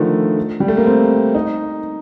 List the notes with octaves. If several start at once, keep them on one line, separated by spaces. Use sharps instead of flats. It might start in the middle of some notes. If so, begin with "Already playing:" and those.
Already playing: D3 D#3 F3 A3
G3
A3
A#3
C4
D#4